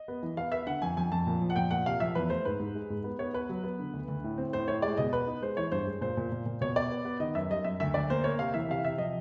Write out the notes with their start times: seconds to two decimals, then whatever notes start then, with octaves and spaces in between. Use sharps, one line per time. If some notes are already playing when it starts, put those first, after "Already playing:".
Already playing: D#5
0.08 B3
0.23 E3
0.37 B3 F5
0.52 B3 E5
0.67 D3 F#5
0.82 F2 G#5
0.97 F2 G#5
1.12 F2 A5
1.27 A#2
1.41 F3
1.50 F#5
1.56 A#2 G5
1.71 A#2 F#5
1.86 C3 F5
2.00 F3 E5
2.15 E2 B4
2.30 A3 C5
2.45 G#2 B4
2.60 G#2
2.75 G#3
2.90 G#2
3.04 B3
3.19 B3 C#5
3.34 B3 B4
3.49 F#3
3.64 B3
3.80 D3
3.94 D2
4.08 D2
4.24 A2
4.38 C4
4.53 A2 C5
4.68 A2 C#5
4.82 G#3 D5
4.97 B2 D#5
5.13 B3 B4
5.27 D#4
5.42 G#3 C5
5.57 E3 C#5
5.72 G2 C5
5.86 G#3
6.01 A#2 C5
6.17 A#2
6.32 A#2
6.46 A#2
6.61 B2 C#5
6.76 B3 D5
6.90 B3
7.05 B3
7.20 D#3 D#5
7.35 F#2 E5
7.50 G3 D#5
7.64 F#2 E5
7.80 D2 E5
7.94 D2 D5
8.10 A#3 C5
8.24 A#3 C#5
8.39 C3 F5
8.54 E3 E5
8.69 C3 F5
8.84 C3 E5
8.98 F3 D#5